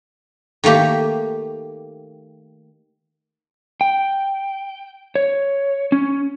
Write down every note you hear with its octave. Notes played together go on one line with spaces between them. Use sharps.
D#3 A3 A#3 G4
G5
C#5
C#4